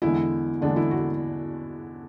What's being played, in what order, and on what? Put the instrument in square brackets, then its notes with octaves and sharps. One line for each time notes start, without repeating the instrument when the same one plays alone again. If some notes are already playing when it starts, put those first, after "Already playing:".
[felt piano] E2 D3 G#3 E4
E2 D3 G#3 D4
E4
F#4